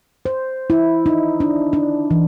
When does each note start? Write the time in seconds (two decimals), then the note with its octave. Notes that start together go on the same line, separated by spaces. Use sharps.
0.25 C5
0.70 E4
1.06 D#4
1.40 D4
1.73 D4
2.11 E3